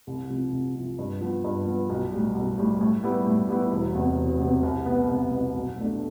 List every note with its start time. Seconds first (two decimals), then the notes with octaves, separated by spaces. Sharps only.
0.07 C2
0.30 C3 F3
0.52 C2
0.75 C3 F3
0.99 G2
1.21 F3 B3
1.44 G2
1.67 F3 B3
1.90 B1
2.12 A2 G3
2.35 B1
2.58 A2 G3
2.80 A2
3.04 G3 B3 E4
3.26 A2
3.49 G3 B3 E4
3.72 E1
3.95 E2 C3
4.17 E1
4.40 E2 C3
4.63 C2
4.86 B2 B3
5.08 C2
5.31 B2 B3
5.54 B1
5.77 B2 A3 D4